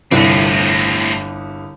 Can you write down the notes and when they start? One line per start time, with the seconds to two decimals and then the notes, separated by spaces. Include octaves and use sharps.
0.12 G1 C2 A2 C4